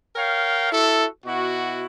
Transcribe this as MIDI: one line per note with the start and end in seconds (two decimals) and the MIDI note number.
0.16 0.71 70
0.16 0.71 73
0.16 0.71 77
0.16 0.71 79
0.72 1.06 64
0.72 1.06 66
0.72 1.06 69
1.26 1.86 47
1.26 1.86 64
1.26 1.86 66